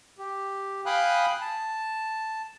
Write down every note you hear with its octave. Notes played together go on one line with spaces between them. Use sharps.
G4
F5 G5 G#5 B5 D#6 F#6
A5